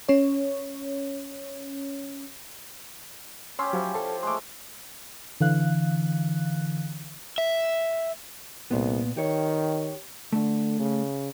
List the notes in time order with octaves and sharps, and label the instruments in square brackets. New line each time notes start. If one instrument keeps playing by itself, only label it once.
[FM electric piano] C#4 C#5
[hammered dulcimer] C#4 G4 [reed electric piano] C#5 C6 E6
[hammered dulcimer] F3 E4 [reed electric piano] F#3 G4
[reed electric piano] A4 A5 [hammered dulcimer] C6
[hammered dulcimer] G#3 A3 [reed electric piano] C6 D6
[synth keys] D3 E3 F5 F#6
[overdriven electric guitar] E5
[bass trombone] C2 [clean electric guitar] A#2 B3
[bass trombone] D#3 [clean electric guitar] G4 C#5
[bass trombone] D3 [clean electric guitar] A3
[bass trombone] C#3